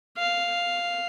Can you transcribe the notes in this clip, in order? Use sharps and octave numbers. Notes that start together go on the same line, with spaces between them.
F5